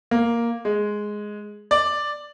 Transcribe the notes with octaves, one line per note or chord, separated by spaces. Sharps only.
A#3
G#3
D5